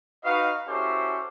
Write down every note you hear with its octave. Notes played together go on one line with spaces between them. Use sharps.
D#4 F#4 B4 D#5 F5
C#4 E4 F#4 G4 A4 C5